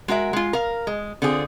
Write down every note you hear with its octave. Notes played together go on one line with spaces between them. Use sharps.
G#3 F#4 A#4 E5
G#3 F4
A#4 F5
G#3
D3 C4 F4 G#4